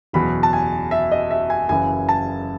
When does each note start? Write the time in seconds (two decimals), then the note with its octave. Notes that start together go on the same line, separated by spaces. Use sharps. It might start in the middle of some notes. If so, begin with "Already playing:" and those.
0.13 F#1 E2 B2 F#3 B5
0.43 A5
0.53 G#5
0.91 E5
1.12 D#5
1.31 E5
1.50 G#5
1.69 F#1 F#2 E3 G#5
2.09 A5